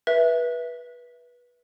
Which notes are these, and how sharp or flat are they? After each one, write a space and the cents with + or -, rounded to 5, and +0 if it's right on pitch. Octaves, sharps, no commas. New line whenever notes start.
B4 -20 E5 +0